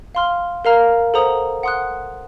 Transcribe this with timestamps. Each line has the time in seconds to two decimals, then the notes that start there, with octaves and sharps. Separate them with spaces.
0.15 F5 C6 F6
0.65 A#4 F5 A#5 F6
1.14 A4 C5 F#5 A#5 D#6
1.63 F#5 C6 D#6 F#6